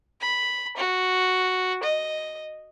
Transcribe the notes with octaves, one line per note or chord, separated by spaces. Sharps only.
B5
F#4
D#5